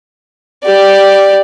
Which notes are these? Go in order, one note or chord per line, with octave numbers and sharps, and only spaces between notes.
G4 D5